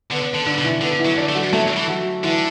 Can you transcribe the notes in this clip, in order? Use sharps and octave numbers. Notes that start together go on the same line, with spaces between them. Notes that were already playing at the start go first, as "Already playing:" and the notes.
D3 B3
D3
D3 D4
B2
E3 E4
D3 B3
E3 E4
F#3
D3 D4
A3
F#3 F#4
F#3 A3 A4
E3
F#3 F#4
D3 E3 E4